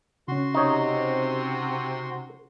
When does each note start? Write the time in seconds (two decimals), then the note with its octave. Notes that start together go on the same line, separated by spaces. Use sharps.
0.28 C#3 C#4 F#4 C6
0.54 C3 D#4 C#5